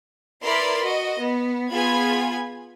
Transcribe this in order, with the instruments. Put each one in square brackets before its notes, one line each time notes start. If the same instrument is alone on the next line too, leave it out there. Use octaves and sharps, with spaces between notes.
[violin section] E4 A#4 B4 D5 B5 C6
F#4 D#5
B3
B3 F4 G#4 G#5 B5 G#6